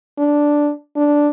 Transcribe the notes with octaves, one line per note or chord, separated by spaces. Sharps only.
D4
D4